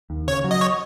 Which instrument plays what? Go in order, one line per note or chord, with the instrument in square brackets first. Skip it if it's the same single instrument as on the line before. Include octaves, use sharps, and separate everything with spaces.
[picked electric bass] D#2
[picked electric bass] C#3 [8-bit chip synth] C#5
[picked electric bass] F#3
[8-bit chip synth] D#5
C#5